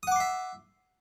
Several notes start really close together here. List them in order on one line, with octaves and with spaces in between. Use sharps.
D#6 F#5 D6 C6 E5